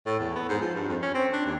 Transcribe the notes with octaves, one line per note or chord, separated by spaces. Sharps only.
A2
E2
B3
G#2
F3
G2
F2
C#4
C4
D4
D#2